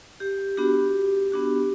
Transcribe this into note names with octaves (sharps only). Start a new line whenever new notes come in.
G4
B3 D4 F#4 G4
B3 D4 F#4